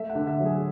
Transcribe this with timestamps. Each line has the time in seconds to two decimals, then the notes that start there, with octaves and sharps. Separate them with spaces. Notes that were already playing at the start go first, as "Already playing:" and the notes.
Already playing: A3 E5
0.10 F#5
0.15 D3
0.27 E5
0.40 F#3
0.45 G#4